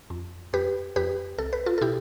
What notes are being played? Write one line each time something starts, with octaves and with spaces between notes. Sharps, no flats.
F2
F2 G4 B4
F2 G4 B4
C2 A4
B4
F4 A4
A4
B2 E4 G4